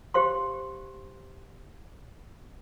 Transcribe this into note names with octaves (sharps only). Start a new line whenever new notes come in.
G4 C5 F5 C6